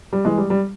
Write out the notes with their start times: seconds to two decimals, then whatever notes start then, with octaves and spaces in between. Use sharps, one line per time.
0.13 G3
0.25 E3 G#3
0.38 G3
0.50 G3